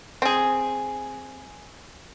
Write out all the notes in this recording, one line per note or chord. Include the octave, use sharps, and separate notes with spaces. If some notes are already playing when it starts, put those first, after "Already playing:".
C4 G#4